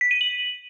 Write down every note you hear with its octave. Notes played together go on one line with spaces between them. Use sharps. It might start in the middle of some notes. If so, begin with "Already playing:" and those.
B6
D#7
F#7